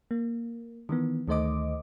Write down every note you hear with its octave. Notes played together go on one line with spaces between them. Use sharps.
A#3
D#3 E3 B3
D2 D#3 A3 C5 D#5 D6